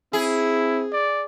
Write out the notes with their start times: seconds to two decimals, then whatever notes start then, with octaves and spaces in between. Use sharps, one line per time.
0.13 C4 E4 G#4
0.92 D5